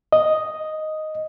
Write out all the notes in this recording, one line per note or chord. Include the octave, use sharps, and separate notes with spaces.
D#5